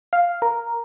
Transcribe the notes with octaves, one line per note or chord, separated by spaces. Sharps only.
F5
A#4